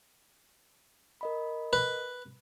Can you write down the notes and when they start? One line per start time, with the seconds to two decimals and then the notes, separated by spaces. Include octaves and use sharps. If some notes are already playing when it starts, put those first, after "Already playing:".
1.21 A#4 D#5 B5
1.73 B4